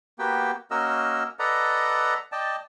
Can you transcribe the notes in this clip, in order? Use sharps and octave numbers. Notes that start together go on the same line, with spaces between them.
A#3 B3 F#4 G4 G5
A#3 C#4 F#4 A#4 D#5 E6
A4 B4 D5 D#5 F#5 A#5
D5 D#5 G5 A5